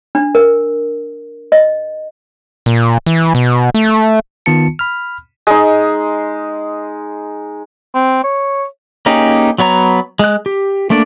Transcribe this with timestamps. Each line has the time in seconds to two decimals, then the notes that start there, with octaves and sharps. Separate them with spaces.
0.15 D4
0.35 A#4
1.52 D#5
2.66 A#2
3.06 E3
3.35 B2
3.74 A3
4.46 D#3 B3 F4 A5 C#7
4.79 B5 F6
5.47 G#3 D#4
7.94 C4
8.24 C#5
9.06 A#3 C#4 D#4 G4 G#4
9.58 F#3 B3 C#5 A#5
10.19 G#3 F#6
10.46 G4
10.90 A3 A#3 D4 D5